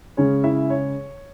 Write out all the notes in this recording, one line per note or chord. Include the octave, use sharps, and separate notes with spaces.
C#3 G#3 C#4 C#5
E4 E5
C#5